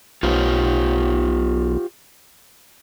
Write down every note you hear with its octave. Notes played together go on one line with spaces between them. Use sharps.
B1 F4 G4 C5